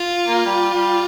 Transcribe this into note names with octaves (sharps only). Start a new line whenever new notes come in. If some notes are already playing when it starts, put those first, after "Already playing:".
Already playing: F4
A#3
G3
G3